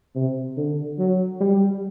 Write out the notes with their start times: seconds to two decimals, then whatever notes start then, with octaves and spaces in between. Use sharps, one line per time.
0.15 C3
0.57 D3
0.99 F#3
1.41 G3